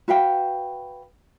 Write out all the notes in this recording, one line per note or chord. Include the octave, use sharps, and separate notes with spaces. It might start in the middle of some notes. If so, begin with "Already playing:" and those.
F#4 B4 F5 G5